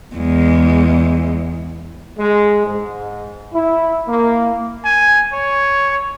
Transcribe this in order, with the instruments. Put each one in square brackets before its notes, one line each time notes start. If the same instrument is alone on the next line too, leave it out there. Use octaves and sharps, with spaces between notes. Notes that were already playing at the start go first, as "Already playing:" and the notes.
[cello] E2 G#3
[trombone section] G#3
G#2
E4
A#3
[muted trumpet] G#5
C#5